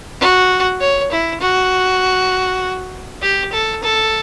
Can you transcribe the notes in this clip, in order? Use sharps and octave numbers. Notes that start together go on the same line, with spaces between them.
F#4
C#5
E4
F#4
G4
A4
A4